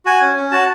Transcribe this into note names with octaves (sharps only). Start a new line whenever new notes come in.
F#4 G#5
C#4
C#4
F#4 A5